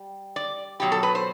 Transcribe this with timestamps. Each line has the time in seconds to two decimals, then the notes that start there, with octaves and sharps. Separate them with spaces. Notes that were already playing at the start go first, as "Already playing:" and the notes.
Already playing: G3
0.36 D5
0.80 B2 F#3 G4
0.92 A4
1.03 B4
1.15 C5